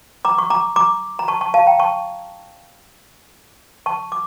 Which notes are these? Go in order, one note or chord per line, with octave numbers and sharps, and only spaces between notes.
A#5 D6
C#6
A#5 D6
A#5 D6
A#5
A5 C#6
A5 C#6
F5 A5
G5 A#5
A5 C#6
A5 C#6
D6